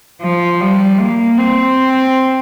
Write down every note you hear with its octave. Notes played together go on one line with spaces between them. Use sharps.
F3
G3
A#3
C4